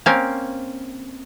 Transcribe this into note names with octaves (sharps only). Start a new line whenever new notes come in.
A#3 C4 C#4